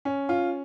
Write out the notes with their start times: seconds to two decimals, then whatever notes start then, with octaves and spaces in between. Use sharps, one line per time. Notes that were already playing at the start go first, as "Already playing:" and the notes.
0.05 C#4
0.29 F4